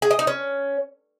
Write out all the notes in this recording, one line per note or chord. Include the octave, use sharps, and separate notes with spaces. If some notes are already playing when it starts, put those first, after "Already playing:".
G#4
D#5
D#4
C#4